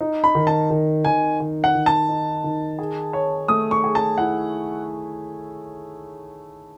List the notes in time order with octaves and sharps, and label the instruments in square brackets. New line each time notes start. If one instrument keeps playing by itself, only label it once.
[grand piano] D#4
[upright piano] B5
[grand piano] D#3
[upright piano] A5
[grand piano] D#3
[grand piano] D#3 [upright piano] G#5
[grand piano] D#3
[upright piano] F#5
[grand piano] D#3
[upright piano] A5
[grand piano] D#4
D#3
G#4
C#5
[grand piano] A3 [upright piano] D#6
[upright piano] C#6
[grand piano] G#4
[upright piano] A5
[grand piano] E4 [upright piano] F#5